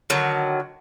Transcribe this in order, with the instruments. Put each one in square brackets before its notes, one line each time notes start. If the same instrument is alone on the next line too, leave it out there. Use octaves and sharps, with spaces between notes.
[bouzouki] D3 D#3 F#3